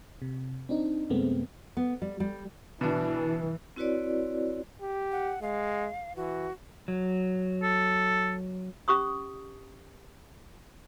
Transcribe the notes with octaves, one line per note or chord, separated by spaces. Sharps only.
C3
C4 D4 D#4
F#2 C3 G#3 A3 B3 C4
B3
G3
G3
B2 E3 D4
C4 E4 F#4 B4 C#5 D5
G4
F#5
G#3 F5
E3 F#4
F#3
A4
C#4 G4 C#6 D#6